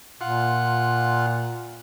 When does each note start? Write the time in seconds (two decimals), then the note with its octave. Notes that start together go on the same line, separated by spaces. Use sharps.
0.21 A#2 F4 F#5